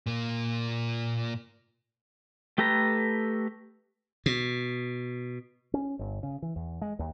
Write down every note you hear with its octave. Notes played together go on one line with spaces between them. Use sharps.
A#2 A#3
A3 G4 A4 B4 A#5
B2
C#4
G1
C#3
E3
E2
G#3
D#2